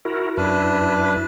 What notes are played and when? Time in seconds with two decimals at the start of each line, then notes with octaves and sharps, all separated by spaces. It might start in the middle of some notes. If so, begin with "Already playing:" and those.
0.05 E4 F#4 A#4
0.37 F#2 D4 E4 B4